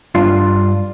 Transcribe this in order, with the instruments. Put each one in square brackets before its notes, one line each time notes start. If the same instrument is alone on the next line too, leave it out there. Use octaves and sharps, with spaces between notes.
[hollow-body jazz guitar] G2 D4 F4